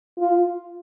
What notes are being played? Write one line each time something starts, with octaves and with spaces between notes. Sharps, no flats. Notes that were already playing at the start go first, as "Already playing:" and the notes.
F4